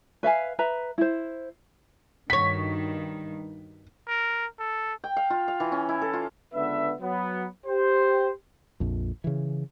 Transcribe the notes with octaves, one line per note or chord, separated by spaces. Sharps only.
B4 E5 F5 G#5
B4 E5 A#5
E4 C5
G2 D#3 F#4 C#5 B6
A#4
A4
G5
F5
F4
F5
E3
C#4
E4
A4
F4
C#2 D3 B3 B4 E5
F#3 B3
G4 C5
A#1 F2
C#3 E3